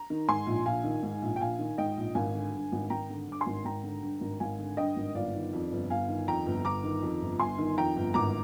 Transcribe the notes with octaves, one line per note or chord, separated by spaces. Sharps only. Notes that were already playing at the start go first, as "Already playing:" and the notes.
Already playing: A#5
D#3
G#2 G#5 C6
A#1
A#1 F5 G#5
D#3
G#2
A#1
G5
A#1 F5 G#5
D#3
G#2 D#5 G5
A#1
G#1 F5 G#5
D3
G2
G#1
G#1 G5 A#5
D3
G2 D6
G#5 C6
G#1
G#1 G5 A#5
D3
G2
G#1
G#1 F5 G#5
D3
G2 D#5 G5
G#1
G1 D5 F5
D#3
F2
G1
G1 F5 G#5
D#3
F2 G5 A#5
G1
G1 A#5 D6
D#3
F2
G1
G1 G#5 C6
D#3
F2 G5 A#5
G1
G#1 A#5 D6